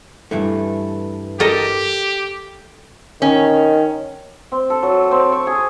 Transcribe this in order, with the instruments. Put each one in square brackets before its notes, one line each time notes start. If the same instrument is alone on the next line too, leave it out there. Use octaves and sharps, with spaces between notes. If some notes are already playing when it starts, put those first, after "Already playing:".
[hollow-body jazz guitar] G2 E3 A3
[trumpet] G4 [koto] A4 A#4 D#5
[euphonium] D#3 [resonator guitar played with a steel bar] C#4
[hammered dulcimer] C4
A4
F#3
C4
C#6
G#4